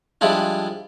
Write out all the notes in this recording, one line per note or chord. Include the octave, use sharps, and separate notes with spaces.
F3 G3 G#3 D4 E4 F4